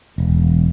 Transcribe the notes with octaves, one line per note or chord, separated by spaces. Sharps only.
E1